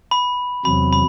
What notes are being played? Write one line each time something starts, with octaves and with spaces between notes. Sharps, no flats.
B5
E2 C3 F#3 B5
B5